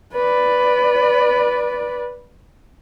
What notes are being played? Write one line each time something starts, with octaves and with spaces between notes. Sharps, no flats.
B4 D5